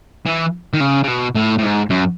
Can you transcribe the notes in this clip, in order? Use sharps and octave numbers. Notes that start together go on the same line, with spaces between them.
E3
D#3
C#3
C#3
B2
A2
A2
G#2
F#2